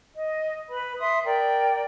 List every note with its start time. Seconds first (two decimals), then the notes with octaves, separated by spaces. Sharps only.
0.17 D#5
0.69 B4 B5
0.99 E5 C6 D#6
1.25 A#4 D5 G5